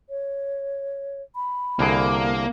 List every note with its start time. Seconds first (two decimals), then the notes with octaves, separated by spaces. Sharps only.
0.10 C#5
1.36 B5
1.79 C2 D3 A#3 G#4